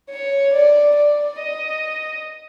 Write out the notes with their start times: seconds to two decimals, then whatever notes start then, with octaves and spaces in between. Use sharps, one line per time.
0.10 C#5
0.53 D5
0.96 D5
1.39 D#5